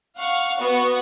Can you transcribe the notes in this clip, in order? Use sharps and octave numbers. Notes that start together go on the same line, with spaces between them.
F5 F#5 C#6
B3 F#4 F#5 C#6